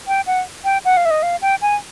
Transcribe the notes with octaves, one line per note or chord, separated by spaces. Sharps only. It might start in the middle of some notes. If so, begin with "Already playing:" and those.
G5
F#5
G5
F#5
F5
E5
D#5
F5
G5
G#5